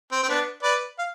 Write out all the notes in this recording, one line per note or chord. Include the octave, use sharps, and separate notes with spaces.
C4
C4
B3 D4
B4 D5
F5